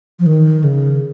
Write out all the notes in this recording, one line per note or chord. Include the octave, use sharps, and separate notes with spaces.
F3
D#3
C#3